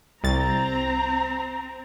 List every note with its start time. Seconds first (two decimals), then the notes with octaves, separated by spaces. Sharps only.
0.24 C2 C4 A#5 A6